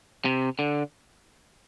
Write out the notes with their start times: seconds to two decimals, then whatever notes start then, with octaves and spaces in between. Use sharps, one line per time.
0.25 C3
0.59 D3